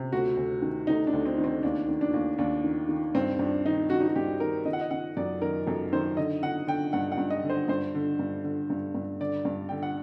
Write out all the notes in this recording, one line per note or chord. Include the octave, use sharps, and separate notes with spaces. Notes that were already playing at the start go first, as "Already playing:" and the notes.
Already playing: C3
D2 F#4
D2
D#3
D2 D#4
D4
D2
C4
D#3
C4
D#2 D4
D#3
D4
D#2
D#2 D4
D#3
D#3
G2 C4
G2 D4
D#3 D#4
D#3 F#4
D#4
F#4
G2 G4
D#3 A#4
D#3 D#5
F#5
D#5
D#3 F#5
F#2 D5
D#3 A#4
F#2 A4
D#3 C5
D3 D#5
D3 F#5
D3 G5
G2 F#5
F#5
G2
D#5
D3
C5
G2 C5
D3
G2
D3
G2
G2
D3 D5
G2
D3 G5
F#5